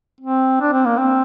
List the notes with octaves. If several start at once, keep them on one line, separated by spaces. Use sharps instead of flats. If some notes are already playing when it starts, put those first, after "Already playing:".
C4
D4
C4
A#3
C4